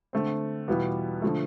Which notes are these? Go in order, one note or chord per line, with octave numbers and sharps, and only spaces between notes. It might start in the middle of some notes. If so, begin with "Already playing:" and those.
D3 A3 C4
E2 B2 G3 B3 F4
D3 F3 A3